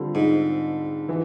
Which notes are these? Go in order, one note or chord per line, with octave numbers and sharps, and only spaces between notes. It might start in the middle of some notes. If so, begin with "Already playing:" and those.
Already playing: D3 G3 C4 F4 A4
G#2
E3